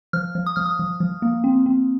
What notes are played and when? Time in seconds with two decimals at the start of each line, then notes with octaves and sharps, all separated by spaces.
0.13 F3 F6
0.35 F3
0.46 D#6
0.56 F3 F6
0.66 D#6
0.79 F3
1.00 F3
1.22 A#3
1.44 C4
1.66 C4